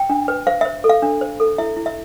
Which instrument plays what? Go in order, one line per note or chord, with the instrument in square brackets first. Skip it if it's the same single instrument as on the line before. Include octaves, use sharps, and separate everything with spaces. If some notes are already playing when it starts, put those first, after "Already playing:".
Already playing: [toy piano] G5
D4
B4
C5 F5
C5 E5
A4
F5
D4
C5
A4
E4 E5
E4
E5